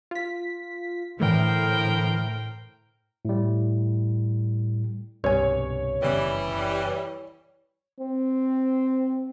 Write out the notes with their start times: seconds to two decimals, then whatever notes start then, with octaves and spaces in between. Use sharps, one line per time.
0.11 F4 B6
1.20 A2 D3 E3 A3 A#4 C5 G5
3.25 A2 G3
5.24 C2 G2 B2 C#5 G#5
6.03 F#1 C#3 E3 G3 B3
8.00 C4